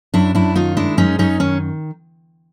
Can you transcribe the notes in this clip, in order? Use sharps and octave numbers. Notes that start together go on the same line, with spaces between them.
F#2 D4 E4
F#2 D4 E4
D#3 D#4 F4
G#3 D4 E4
F#2 C#4 D#4
F#2 C#4 D#4
D#3 C#4